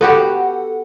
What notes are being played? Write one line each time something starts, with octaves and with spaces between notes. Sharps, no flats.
B3 F#4 G4 A4 F#5